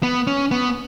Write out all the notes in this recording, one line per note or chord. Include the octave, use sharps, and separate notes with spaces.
B3
C#4
B3